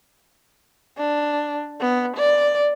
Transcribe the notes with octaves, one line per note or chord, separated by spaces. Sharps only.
D4
B3
D5